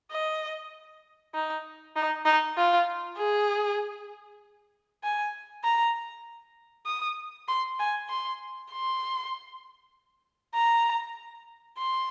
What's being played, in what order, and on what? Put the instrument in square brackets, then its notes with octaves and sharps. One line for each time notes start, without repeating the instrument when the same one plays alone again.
[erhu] D#5
D#4
D#4
D#4
F4
G#4
G#5
A#5
D#6
C6
G#5
C6
C6
A#5
C6